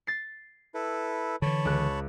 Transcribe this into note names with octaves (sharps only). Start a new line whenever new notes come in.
A6 C7
E4 A4 B4
D3 E3 C#5 A5 B5
C#2 F#6